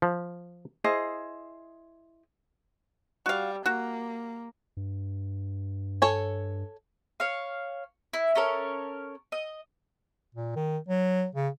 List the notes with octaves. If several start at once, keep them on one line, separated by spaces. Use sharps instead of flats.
F3
E4 G#4 C5 D#5
G3 F#4 F5
A#3 F#4
G2
A4 C#5 G#5
C#5 F5
E4
C#4 A4 A#4 C#5
D#5
A#2
D#3
F#3
C#3